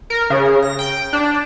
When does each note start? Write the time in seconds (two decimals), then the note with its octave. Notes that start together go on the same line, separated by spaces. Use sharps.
0.10 A#4
0.30 C#3
0.63 A#6
0.79 G5
1.13 D4